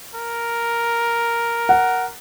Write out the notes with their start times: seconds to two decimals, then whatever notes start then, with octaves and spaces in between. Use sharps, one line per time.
0.15 A#4
1.69 F#5